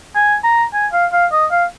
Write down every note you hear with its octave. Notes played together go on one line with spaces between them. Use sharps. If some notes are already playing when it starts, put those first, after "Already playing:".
G#5
A#5
G#5
F5
F5
D#5
F5